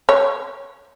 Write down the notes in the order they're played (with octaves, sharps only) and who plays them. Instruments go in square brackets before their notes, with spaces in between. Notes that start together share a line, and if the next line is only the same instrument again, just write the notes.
[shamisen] C#5